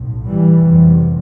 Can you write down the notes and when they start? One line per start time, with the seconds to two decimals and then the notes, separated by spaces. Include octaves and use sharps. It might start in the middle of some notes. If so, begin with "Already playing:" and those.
Already playing: B1 A2
0.26 E3 G3
0.59 F1 E2 C3